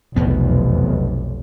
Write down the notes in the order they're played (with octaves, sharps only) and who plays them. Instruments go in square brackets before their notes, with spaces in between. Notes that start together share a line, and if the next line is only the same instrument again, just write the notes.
[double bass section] F1 B1 [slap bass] E2 B3